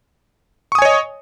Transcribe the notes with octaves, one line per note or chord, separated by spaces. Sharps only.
C#5 D#5 G#5 C#6 D#6